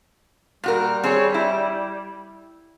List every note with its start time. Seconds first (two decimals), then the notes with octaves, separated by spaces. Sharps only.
0.64 A#2 G3 F#4 A#4
1.04 C4 G#4 C#5
1.34 E4